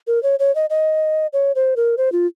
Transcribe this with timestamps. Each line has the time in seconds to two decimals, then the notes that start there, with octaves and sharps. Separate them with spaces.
0.07 A#4
0.23 C#5
0.39 C#5
0.55 D#5
0.70 D#5
1.33 C#5
1.55 C5
1.76 A#4
1.97 C5
2.12 F4